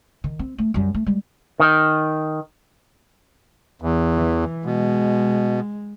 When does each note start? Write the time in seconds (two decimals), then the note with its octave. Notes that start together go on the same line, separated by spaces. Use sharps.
0.24 D#3
0.39 C4
0.58 A3
0.74 F#2 G3
0.94 A3
1.06 G3 G#3
1.60 D#3
3.82 E2
4.14 E3
4.66 B2 G#3